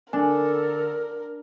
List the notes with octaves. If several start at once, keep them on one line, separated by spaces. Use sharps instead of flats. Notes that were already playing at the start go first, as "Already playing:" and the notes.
D3 D4 A4 A#4 G#5